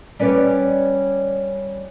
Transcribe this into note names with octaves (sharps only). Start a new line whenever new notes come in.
G3 C#4 B4 C#5 D5